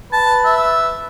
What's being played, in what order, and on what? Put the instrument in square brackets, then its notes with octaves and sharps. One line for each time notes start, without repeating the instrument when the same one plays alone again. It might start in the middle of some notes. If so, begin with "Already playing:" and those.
[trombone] B4 [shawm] A5
[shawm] E5